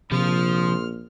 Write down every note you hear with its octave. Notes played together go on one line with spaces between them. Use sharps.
A#1 C3 F3 C6 D#6 F6